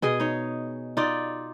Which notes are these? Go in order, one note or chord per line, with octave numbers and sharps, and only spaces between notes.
B2 G#4 D#5
D#4 C#5
D#4 F4 D5